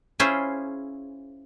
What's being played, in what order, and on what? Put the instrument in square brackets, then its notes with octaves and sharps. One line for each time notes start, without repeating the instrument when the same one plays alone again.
[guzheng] C#4 E4 F4 G#4 C5 C#5